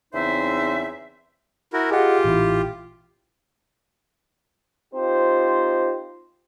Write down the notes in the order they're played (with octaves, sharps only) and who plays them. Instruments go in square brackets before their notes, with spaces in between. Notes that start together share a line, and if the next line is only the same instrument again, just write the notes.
[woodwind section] E2 C#3 C4 D#4 C5 E5
[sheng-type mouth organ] E4 F#4 A#4
[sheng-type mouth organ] F4 G4 [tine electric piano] G#4 D#5 F#5
[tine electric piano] A1 A#2 E4
[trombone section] C4 D#4 F4 G4 C5